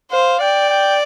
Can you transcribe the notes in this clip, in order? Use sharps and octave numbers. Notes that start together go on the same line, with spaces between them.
C5 F5
D5 G5
G5